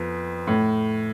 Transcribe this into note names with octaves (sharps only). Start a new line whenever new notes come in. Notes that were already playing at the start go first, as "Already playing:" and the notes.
Already playing: F2 F3 B3
A2